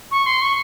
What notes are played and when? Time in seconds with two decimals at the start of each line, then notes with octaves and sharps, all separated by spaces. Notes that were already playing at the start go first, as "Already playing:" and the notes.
0.11 C#6
0.26 C6
0.41 C#6